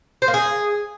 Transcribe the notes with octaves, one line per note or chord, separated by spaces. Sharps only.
C5
A#3
G#4